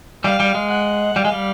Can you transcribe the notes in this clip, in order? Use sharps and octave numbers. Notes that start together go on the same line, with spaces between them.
G3 F5
G3
G#3
F#5
G3 F5
G#3
G3